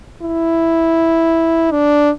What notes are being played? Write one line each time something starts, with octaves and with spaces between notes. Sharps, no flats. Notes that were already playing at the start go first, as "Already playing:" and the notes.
E4
D4